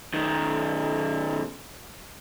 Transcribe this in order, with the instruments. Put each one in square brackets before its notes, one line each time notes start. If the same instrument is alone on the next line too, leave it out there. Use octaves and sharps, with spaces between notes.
[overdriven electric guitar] B1 D#3